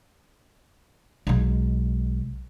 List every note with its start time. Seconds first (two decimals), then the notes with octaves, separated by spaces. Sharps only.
1.27 B1 G#3